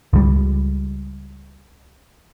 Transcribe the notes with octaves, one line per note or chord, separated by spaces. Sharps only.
C#2 G3